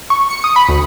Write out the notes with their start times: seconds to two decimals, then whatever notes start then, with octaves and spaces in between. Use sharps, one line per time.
0.10 C#6
0.30 C#7
0.44 D#6
0.56 B5
0.69 D2